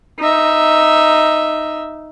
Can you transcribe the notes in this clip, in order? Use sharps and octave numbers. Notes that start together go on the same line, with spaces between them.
D#4 E5